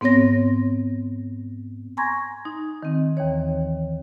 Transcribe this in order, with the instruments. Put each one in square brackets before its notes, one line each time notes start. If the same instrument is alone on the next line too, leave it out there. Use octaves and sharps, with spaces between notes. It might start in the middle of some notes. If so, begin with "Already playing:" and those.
[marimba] G#2 B3 C4 C#5 A#6
G#5 A#5 C6 C#6 G#6 A#6
D#4
D#3 C4
D#2 E3 C#5